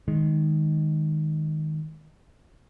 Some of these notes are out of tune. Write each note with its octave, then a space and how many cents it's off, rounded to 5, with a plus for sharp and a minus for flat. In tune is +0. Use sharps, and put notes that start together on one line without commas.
D#3 +0 G#3 +0